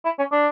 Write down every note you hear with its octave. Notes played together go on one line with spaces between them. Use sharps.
E4
C#4
D4